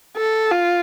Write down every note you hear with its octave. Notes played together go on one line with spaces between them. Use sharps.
A4
F4